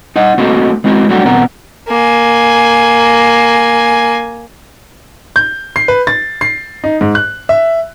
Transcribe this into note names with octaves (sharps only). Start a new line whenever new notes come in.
D#4 D#5 F#5
A3 A#3 C4 D#4 F#4 A4
G#3 C4 E4 F#4 A#4
F#3 G3 A3 D4 F#4 G4
E2 B2 C4 A#4 F#5
A#3 G#5
G6
C7
B4
A6
C7
D#4
G#2
F#6
E5